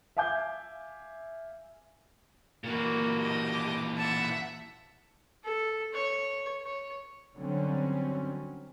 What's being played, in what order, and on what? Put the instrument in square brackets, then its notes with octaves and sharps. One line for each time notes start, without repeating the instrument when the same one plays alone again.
[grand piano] E5 F5 G#5 D6 G6
[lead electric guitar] A#2 E3 [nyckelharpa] A#3 F#4
[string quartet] G4 D#5 A5
[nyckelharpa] D6
[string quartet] E5 F#5 [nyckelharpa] A5
[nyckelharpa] A4
C#5
C#5
[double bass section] D3 F#3 G3 C4 C#4